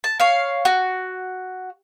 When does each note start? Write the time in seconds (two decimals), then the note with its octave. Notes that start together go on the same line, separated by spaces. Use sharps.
0.04 A5
0.20 C#5 F5
0.65 F#4